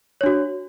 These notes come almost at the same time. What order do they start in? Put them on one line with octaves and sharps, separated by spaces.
C#5 D4 F#4